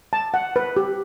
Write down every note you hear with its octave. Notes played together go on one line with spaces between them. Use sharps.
A5
F#5
B4
G4